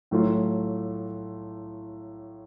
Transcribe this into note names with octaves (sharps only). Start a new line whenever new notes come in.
A2 F#3 A3 F4